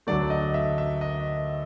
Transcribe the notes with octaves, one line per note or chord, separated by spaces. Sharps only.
D2 D3 F#3 A3 D5
D#5
E5
E5
D#5